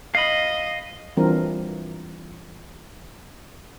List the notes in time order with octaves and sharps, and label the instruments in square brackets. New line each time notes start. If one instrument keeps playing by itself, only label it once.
[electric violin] D#5 [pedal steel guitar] F5 B5
[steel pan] E3 G3 C4 D4 F4 A#4